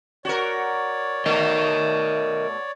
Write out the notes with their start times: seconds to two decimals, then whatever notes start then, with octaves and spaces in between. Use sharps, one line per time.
0.25 F#4 A#4 C#5 D5
1.26 B2 A3 A#4 D#5